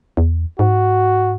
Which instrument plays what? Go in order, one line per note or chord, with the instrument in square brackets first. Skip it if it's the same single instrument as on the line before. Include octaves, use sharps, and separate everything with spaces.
[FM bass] E2
[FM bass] G#2 [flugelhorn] F#4